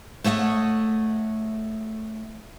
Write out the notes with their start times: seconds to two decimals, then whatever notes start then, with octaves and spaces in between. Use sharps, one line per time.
0.24 A3 C#5 D#5 E5 F#5